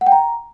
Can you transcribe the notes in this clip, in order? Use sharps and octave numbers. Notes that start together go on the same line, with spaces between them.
F#5
G5
A#5